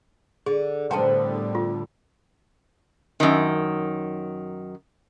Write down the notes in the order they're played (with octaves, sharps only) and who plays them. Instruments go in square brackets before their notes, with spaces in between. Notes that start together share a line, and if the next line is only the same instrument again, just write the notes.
[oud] D3 [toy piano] G#4
[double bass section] A2 D3 G3 [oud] B3 A#4 C5 [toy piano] G5 A5
[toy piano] F4
[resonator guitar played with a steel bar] F#2 D#3